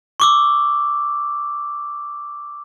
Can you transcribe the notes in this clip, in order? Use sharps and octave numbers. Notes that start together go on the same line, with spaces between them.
C#6 D6 E6